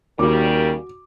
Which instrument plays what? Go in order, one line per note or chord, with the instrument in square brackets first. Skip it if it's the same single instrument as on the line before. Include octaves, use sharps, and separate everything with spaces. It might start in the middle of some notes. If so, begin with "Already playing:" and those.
[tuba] D#2 [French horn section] C#3 G3 A#4 [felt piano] F#4 D6